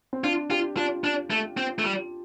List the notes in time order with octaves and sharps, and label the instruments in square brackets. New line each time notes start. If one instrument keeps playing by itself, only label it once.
[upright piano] C4
[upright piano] D4 [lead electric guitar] F4
[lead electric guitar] F4 [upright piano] G4
[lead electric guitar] D4 [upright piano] F4
[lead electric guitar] D4
A3
C4
A3
G3